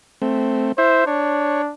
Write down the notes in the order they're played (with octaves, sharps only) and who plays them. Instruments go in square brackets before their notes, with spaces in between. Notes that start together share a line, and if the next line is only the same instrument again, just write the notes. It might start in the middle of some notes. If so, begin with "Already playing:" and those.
[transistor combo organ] A3 C4
[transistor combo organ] E4 E5 [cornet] C5
[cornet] D4 [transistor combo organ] C#5